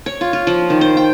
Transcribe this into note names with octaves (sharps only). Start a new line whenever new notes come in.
C#5
F4
F4
F3
D#3
C5
G5